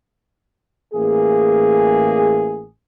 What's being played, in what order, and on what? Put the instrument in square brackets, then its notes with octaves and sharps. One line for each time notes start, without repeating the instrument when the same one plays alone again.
[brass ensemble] A1 A#3 G#4